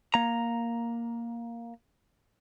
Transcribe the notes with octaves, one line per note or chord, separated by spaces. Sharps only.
A#3 A#5